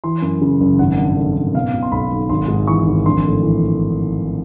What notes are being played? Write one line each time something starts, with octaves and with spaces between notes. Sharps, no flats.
E3 C6
F#2
C#3
F#1
G#1 F#5
G2
D3
G#1
B2 F5
B2
C6
B1 B5
B1
G#1 C6
G#2
E3 C#6
G#1
A#1 C6
A2
E3